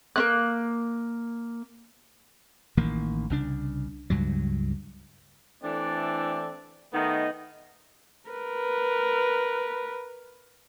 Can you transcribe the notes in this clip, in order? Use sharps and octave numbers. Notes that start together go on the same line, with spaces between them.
A#3 C#4 F#6
A1 D#3 A#3
C2 C#3 D4
C#2 G2 F#3
E3 A3 C4 D4 A4 D5
D#3 A3 B3 D#4
A#4 B4